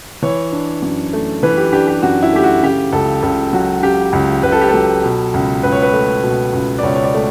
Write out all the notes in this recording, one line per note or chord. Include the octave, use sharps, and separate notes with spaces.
E3 C#5
D4
F#2
A3
E3 B4
G4
D4 G4
G4
F#2 F#4
E4
A3 G4
F#4
C#3 G4
C#2 A4
C#2 A4
F#3 F#4
C#3 G4
C#2
C#2 B4
A4
G4
F#3 A4
B2
C#2
C#2 B4
C#5
B4
A3
B2
C#2
D5
C#2 C#5
C#5
D5
A3